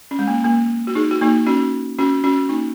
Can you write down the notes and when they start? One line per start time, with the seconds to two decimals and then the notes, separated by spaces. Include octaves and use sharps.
0.11 C#4
0.19 G#3
0.28 A#3
0.44 A#3
0.87 F#4
0.95 D#4 G#4
1.11 F#4
1.21 A#3 D#4
1.47 C#4 F#4
1.99 C#4 F#4
2.24 C#4 F#4
2.49 A#3 D#4